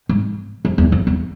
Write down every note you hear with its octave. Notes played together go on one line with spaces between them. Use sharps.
G#2
F2
E2
F2
E2